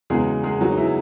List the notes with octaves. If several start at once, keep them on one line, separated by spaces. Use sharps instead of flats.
E2 C#3 F#3 G#3 G#4
G#3 G#4
F#3 F#4
D#4
E4